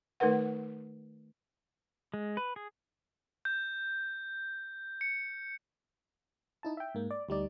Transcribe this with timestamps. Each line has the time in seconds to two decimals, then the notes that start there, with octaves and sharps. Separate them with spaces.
0.20 D#3 A3 D#4 A#4 B4 F#5
2.14 G#3
2.37 B4
2.56 G#4
3.45 G6
5.01 C#7
6.63 D#4 E4 A5
6.77 E5 G5
6.95 G#2 A#3
7.11 D5
7.29 D2 G3 D#4 D5